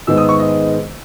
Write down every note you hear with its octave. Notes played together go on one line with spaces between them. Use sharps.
G#2 D#3 G#3 B3 E6
D#6
C#6
D#5